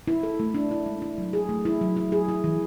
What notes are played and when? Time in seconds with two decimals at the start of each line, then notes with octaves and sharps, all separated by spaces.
0.08 E4
0.23 A4
0.40 A3
0.54 D4
0.71 E4
0.86 G#3
1.02 E4
1.18 F#3
1.33 G#4
1.49 A3
1.65 E4
1.81 F#3
1.97 E4
2.12 G#4
2.29 E4
2.44 E3